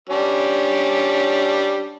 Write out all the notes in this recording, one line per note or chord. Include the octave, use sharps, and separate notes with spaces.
G3 C#4 D4